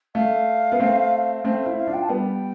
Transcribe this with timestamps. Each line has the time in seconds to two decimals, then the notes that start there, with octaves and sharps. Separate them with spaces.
0.15 A3 F5
0.72 B3
0.80 A3 C4
1.44 A3 C4 F5
1.60 F5
1.66 C4 E4
1.77 F5
1.87 D4 F4
1.93 G5
2.02 A5
2.09 G3 B3 G5